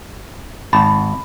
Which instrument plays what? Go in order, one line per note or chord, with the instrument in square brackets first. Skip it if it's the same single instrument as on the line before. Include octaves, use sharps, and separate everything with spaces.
[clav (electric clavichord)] G#1 A5 [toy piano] B5